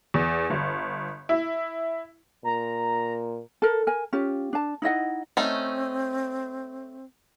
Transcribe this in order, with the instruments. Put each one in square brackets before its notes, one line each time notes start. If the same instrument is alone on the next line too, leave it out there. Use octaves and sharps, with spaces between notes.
[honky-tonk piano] E2
G1
E4
[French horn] A#2 [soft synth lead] A#5
[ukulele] A4 A#4
A#4 G#5
C#4 F4 G4
D4 A5
D#4 E4 D#5 F#5
[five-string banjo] A3 C#4 D#4 [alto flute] C4